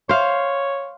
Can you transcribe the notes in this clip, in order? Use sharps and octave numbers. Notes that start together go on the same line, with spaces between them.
C5 C#5 F5